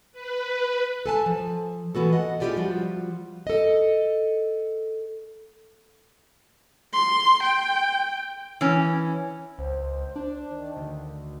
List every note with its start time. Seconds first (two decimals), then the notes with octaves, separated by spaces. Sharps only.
0.12 B4
1.06 A4 G#5 A5
1.26 F3
1.95 E3 B3 F#4 A4
2.13 D#5 F#5
2.40 C#4 E4 F4 G4 G#4 D5
2.57 F3 G3 F4 F#4
3.47 A4 D#5
6.93 C6
7.43 G5
8.61 E3 C#4
9.58 C#2 C5
10.16 D4
10.50 D#3
10.76 D2